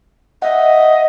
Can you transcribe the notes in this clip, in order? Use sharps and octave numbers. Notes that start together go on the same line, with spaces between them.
D#5 E5 F#5